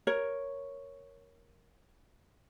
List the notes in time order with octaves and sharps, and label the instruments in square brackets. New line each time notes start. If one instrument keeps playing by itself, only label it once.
[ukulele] A#4 C#5